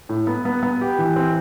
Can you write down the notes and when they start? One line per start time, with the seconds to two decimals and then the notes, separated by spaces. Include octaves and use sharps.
0.09 A2
0.27 B3
0.45 B3
0.63 B3
0.81 G4
0.99 E3
1.16 C4